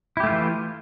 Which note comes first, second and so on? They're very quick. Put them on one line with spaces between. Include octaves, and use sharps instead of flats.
E4 G4 A3 F4 E3